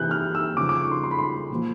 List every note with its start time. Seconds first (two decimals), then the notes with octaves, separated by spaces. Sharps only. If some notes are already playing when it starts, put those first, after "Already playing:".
Already playing: C3 E3 F#6 G6
0.11 F6
0.35 E6
0.57 C#3 F3 D6
0.69 D6
0.81 C#6
0.92 C6
1.04 C6
1.11 B5
1.19 C6
1.50 A#2 F3